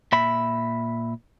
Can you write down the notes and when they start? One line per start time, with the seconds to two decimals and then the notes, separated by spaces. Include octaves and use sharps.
0.12 A#2 E5 B5